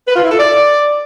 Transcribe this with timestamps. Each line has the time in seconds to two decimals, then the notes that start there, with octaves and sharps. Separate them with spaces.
0.08 B4
0.16 F4
0.24 E4
0.32 A4
0.39 D5